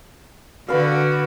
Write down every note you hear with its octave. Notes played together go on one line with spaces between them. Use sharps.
D3 F#4 B4 F5